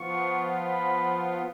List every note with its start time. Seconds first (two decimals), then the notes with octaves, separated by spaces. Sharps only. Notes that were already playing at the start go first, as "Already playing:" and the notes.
Already playing: F3 B3 F4 C#6
0.66 B5